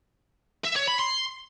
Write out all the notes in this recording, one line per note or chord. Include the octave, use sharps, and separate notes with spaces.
E5
C#5
B5
C6